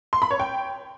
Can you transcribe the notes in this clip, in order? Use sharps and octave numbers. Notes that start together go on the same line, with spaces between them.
C6
B5
C#5
G5